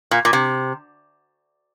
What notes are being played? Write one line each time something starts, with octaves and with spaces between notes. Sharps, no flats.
A#2
A#2
C3